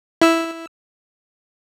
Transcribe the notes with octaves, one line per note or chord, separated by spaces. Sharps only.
E4 E6